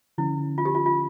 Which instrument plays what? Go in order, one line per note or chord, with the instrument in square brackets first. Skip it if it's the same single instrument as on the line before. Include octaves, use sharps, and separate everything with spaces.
[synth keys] D3 F3 C#4 [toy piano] E4
[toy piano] F4
G4
F4
F4